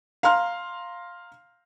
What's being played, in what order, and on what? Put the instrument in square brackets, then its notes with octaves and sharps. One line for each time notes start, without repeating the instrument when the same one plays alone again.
[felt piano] F5 A#5 C6 F6